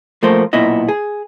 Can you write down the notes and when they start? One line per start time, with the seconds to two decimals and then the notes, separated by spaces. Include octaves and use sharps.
0.23 F3 A3 A#3 C5
0.53 B1 A#2 B3 E4 D#5
0.88 G#4